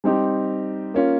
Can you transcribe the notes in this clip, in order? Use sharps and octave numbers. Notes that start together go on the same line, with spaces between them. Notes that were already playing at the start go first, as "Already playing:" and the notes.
G3 C4 D#4 G4
A#3 C#4 F4